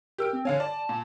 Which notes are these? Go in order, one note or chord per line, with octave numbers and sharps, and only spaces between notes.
G4 A#4 E6 D7
C4
D3 C#5 F5 G#5
D5 A5
A#2